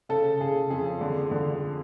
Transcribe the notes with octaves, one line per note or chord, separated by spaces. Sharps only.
C#3 A4
C#3 G#4
F2 G#4
D3
D3